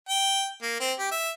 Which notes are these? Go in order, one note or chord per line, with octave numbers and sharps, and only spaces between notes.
G5
A#3
C4
G4
E5